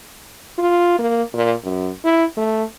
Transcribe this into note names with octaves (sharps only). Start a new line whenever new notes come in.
F4
A#3
A#2
F#2
E4
A3